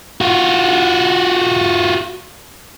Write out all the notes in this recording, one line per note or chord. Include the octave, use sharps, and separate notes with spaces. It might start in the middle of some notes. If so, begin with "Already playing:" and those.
F4 F#4